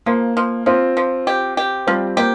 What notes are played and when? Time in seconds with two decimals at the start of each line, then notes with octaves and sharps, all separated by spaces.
0.06 F3 A#3
0.37 F3
0.66 F3 C4 F4
0.97 F3
1.27 G4
1.57 G4
1.87 F3 G3 C4
2.17 A#3 G4